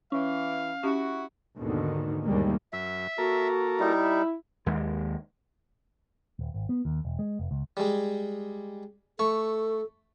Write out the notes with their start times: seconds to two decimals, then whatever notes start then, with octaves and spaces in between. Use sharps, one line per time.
0.12 E3 C#4 F5
0.83 C#4 E4 F#4 G4
1.57 D#2 G#2 B2 D3 D#3
2.23 G1 D#2 B2 G3 G#3 A#3
2.73 F#2 E5
3.18 A#3 F#4 A4 A#4
3.80 G3 D#4 E4
4.66 D#2 G#3
6.39 D#1
6.54 G#1
6.69 B3
6.85 D#2
7.05 E1
7.19 G#3
7.39 F1
7.51 C#2
7.77 G3 G#3
9.19 A3 A4 C#6